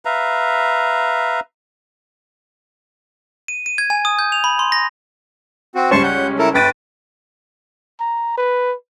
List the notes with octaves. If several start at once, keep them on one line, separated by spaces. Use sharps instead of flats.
B4 E5 F5 A#5
D#7
D#7
G#6
G#5
D#6
G6
F7
B5
C6
A#6
C4 F#4
C#2 G3 C#4 C5 A5 C#6
F#5 G6
E4 A4 A#4
G1 B4 G5 A6 D#7
A#5
B4